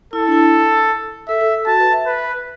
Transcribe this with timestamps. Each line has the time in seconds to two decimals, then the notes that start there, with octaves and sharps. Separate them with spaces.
0.13 E4 A4
0.28 D4
0.32 E4
1.28 A4 E5
1.41 A4
1.54 A4
1.67 F#4 A5
1.80 B4
1.93 E5
2.06 B4